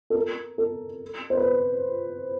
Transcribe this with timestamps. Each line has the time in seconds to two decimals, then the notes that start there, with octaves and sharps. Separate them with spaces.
0.10 A4
0.14 A#4
0.58 A4
1.30 C5
1.37 B4